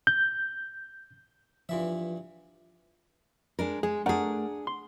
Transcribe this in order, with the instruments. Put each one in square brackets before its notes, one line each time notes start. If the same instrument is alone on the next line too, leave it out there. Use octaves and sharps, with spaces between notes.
[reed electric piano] G6
[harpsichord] G2 E3 E5 [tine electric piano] F3 F4
[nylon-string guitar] G#3 D4 A#4
[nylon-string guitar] G#3 [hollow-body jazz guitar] G#4
[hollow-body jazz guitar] A3 A#4 F#5 [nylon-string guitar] D4 G#4
[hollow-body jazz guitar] C6